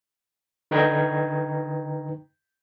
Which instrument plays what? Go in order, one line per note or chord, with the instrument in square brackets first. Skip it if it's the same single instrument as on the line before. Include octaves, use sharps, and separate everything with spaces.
[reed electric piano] D3 D#4 B4 G5 A#5 G#6